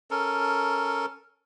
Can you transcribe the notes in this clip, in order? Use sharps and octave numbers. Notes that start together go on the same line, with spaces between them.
C#4 A4 A#4